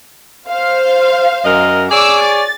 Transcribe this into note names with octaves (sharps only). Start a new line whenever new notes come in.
C5 F5
F#2 A#4 D#5
G#4 C#5 D5 D6 E6
A6